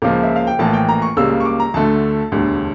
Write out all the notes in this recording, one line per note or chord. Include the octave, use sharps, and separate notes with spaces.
C#2 C#3 F3 A#3 D6
E5
F5
G5
A#1 A2 E3 A#3 A5
G5
A#5
C#6
C#2 C#3 G3 A#3 E6
C#6
D6
A#5
D2 D3 A3 A5
E1 D2 D3 G3